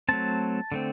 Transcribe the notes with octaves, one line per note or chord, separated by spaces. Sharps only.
F#3 A3 C4 A5
D3 A3 C4